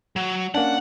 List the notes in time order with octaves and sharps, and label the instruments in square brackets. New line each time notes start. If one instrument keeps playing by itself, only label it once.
[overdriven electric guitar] F#3
[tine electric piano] A#3 C#4 D4 [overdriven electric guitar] F#5